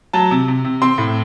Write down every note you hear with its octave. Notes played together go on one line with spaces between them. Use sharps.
F#3 A5
C3
C3
C3
C4 C6
A2